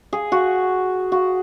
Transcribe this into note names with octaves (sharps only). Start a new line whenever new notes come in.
G#4
F#4
F#4